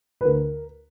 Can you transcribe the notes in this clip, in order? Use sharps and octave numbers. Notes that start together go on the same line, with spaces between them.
B4
D2 A#4